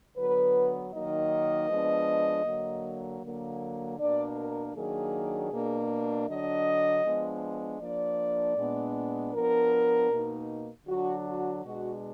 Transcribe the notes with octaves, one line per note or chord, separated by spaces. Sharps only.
D3 F#3 B3 B4
D#3 F#3 A#3 D#4 D#5
F3 G#3 B3 D4
D3 F#3 A#3
D3 F#3 A#3
B2 A#3 D4 D5
A#4
D#3 F#3 A#3 D4 G#4
B2 A#3 D4
D3 F#3 D4 D#5
F3 G#3 B3 D4
F3 A#3 D4 D5
A#2 G#3 B3 D4
F3 B3 D4 A#4
B2 A#3 D#4
D3 F#3 D4 F#4
F#4
B2 G#3 D4 F#4